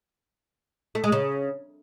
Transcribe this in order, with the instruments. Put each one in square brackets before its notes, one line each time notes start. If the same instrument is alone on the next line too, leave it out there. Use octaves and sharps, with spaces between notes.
[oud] A3
G#3
C#3